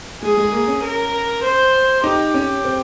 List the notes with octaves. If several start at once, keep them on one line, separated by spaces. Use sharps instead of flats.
G#3 G#4
G#3
A#3
C#4
A#4
C5
D#4 G4
C#4
C4